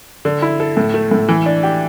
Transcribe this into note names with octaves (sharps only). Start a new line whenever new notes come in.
D3
E4
A4
A2
A3
A2
E3
D4
G4